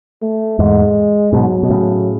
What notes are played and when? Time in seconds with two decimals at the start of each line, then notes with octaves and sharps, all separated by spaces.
0.22 A3
0.59 E2 G#2 G#3
1.33 G#2 B2 F#3
1.63 B2
1.70 A2 C#3